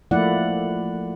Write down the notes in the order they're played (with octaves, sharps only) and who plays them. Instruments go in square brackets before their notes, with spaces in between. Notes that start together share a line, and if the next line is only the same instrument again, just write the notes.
[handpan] F3 A3 A#3 E4 D5 F#5